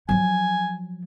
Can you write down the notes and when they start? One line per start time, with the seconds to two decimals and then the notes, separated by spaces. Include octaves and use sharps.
0.09 F3 F#3 G#5